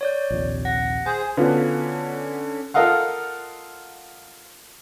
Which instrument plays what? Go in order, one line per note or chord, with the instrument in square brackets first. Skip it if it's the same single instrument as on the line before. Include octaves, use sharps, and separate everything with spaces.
[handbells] C#5 D5 G6
[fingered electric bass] A#1 D#2 C3
[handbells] F#5 A#6
[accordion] G#4 C5 [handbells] G#5
[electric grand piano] D3 C#4 D4 [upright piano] B3 F4 F#4
[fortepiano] F4 A4 A#4 D#5 F5 F#5